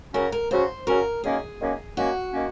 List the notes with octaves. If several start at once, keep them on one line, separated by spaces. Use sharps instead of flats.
C#3 F#3 C#4 F#4 A#4
A#4
C#3 F#3 C#4 F#4 C5
C#3 F#3 C#4 F#4 A#4
F#2 D#3 A#3 C#4 G#4
F#2 D#3 A#3 C#4
F#2 D#3 A#3 C#4 F#4
D#3 A#3 C#4